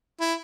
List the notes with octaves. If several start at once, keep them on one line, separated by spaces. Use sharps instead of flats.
E4